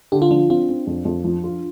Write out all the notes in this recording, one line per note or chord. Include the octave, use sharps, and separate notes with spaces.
D3 G4
F4
F3 D4
C4 F4
C4
F2
F2
F3
F4